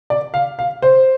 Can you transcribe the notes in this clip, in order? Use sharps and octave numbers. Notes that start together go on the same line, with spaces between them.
D5
F5
F5
C5